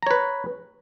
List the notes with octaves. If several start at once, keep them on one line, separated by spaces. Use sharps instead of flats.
B4 C#5 A#5